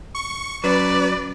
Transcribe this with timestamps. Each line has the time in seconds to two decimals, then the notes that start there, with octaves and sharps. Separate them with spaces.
0.15 C#6
0.64 F#3 C#4 B4 D5